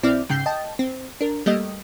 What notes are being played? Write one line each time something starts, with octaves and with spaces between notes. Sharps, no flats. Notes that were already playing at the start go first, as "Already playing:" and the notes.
B1 C4 E4 D5 F6
G#2 C#3 G5 G6 C7
D#5 G5 A5
C4
D4 A#4
G3 A3 A#3 G4 D#5